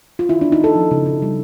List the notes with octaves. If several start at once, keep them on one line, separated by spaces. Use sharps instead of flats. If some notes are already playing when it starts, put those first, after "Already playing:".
F4
D#3 E4
D4
B3
D#4
D4 A4
F3
C#3
C#3
G3